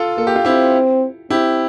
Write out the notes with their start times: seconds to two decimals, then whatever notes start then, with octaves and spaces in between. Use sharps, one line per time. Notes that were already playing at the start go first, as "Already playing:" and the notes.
Already playing: F4 A4
0.17 A#3 A4
0.27 G4
0.36 F4
0.45 C4 E4 G4
1.30 C4 E4 G4